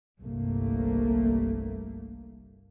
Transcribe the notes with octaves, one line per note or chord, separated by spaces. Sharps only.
G1 C2 G2 A3 A#3